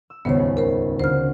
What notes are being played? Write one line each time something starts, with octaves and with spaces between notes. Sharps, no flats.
E6
D#1 G#1 C#2 B3 C5 C#5
G#4
A#4 C5
D2 C#3 C5 F6